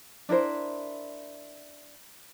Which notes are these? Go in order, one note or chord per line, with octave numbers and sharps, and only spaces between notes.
D4 E4 A#4 C5